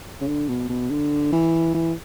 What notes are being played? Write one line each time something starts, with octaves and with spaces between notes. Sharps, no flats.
C#3
D3
B2
B2
D3
E3
E3